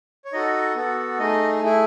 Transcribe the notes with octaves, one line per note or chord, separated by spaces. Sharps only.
C#5
D#4 F#4 A4 D#5
B3 F#4 A4
A3 D#4 G#4 D#5
A3 E4 G#4